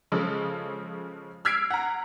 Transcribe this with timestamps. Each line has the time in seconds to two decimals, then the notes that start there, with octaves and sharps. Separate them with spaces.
0.12 C#3 F3 G#3 A4
1.45 E6 F6 G#6 B6 C7 D7
1.70 F#5 A#5